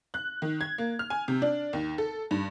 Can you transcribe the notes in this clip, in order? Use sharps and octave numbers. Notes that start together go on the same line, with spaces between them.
F#6
D#3
G#6
A#3
F6
G#5
C3
D4
D#2
A4
G2